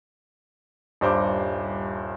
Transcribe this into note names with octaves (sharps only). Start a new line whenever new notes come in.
D#1 G2 C5 D6